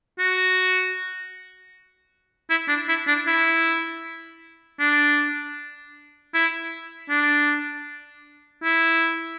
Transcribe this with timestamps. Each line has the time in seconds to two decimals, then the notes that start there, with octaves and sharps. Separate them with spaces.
0.19 F#4
2.50 E4
2.68 D4
2.89 E4
3.07 D4
3.27 E4
4.79 D4
6.34 E4
7.10 D4
8.63 E4